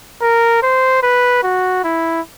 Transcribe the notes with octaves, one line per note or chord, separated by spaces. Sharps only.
A#4
C5
B4
F#4
E4